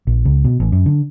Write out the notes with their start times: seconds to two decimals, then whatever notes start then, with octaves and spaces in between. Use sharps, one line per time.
0.07 A#1
0.25 C#2
0.45 B2
0.60 A1
0.72 F#2
0.86 D3